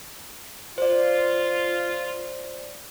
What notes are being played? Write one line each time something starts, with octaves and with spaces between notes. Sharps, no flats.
F4 C5 D5